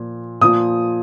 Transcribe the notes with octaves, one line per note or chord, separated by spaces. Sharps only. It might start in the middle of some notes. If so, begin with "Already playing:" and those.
Already playing: A#2 F3
A#2 F3 D#6